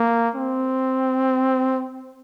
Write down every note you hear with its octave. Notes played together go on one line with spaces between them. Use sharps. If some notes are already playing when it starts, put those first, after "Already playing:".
Already playing: A#3
C4